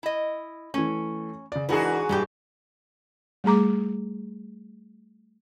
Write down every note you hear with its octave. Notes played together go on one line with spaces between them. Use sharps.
E4 D#5
E3 A3 C#4
C#3 D5
G#2 E3 D4 F#4 G#4 A#4 B4
G2 A#2 E3 G4
G3 A3 G#4 A#5 D6